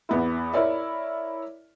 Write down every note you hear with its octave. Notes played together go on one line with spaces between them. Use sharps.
E2 B3 E4
E4 A#4 C#5 D5 E5